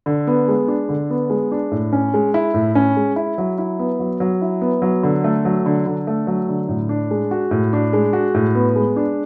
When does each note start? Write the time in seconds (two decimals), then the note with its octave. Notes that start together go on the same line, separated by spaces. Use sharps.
0.06 D3
0.27 B3
0.48 G#3
0.68 D4
0.89 D3
1.10 B3
1.30 G#3
1.52 D4
1.72 A2
1.93 C#4
2.14 G#3
2.34 E4
2.54 A2
2.75 C#4
2.97 G#3
3.16 E4
3.38 F#3
3.58 E4
3.79 B3
4.00 F#3
4.20 F#3
4.42 E4
4.62 B3
4.82 F#3
5.03 D3
5.24 A3
5.45 F#3
5.66 D3
5.86 D3
6.07 A3
6.27 F#3
6.49 D3
6.69 A2
6.89 D4
7.11 G#3
7.31 F#4
7.51 A2
7.73 D4
7.93 G#3
8.13 F#4
8.34 A2
8.55 B3
8.76 G#3
8.96 D4